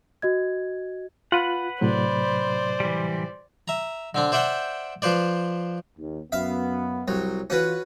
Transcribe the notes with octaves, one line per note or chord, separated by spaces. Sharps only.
F#4 D#5 G#6
F4 B4 F#5
A2 C3 F#3 C5 D5
E3 G3
E5 A#5
D3 C4 D4
C5 D5 E5 F#5 G5
F3 B4 C5 D5
D#2
F#2 B3 E5 F5
C2 F#3
E3 C#4 F4 F#4 B4